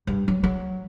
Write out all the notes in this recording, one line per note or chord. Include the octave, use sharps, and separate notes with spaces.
G2
F#3
F#3